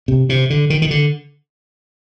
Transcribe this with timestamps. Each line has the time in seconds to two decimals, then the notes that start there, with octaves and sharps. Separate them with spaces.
0.08 C3
0.29 C3
0.50 D3
0.70 D#3
0.82 D#3
0.91 D3